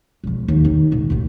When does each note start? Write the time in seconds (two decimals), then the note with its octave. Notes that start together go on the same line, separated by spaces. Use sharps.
0.24 E1 F3
0.48 D#2
0.64 D#3 D#4
0.91 E1 A#1
1.10 A1 D#2